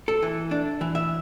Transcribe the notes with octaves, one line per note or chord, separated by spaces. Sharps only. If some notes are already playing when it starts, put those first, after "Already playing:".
A4
E3
D4
E3
E5